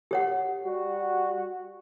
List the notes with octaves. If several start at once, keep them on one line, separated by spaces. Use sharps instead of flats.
G4 C#5 F#5
G3 F#4